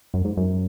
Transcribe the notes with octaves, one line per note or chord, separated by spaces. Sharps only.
F#2
G#2
F#2